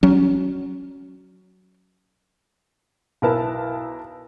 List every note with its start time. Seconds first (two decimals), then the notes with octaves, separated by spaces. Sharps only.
0.03 F#3 C#4
3.22 B1 E4 A#4 B4 A5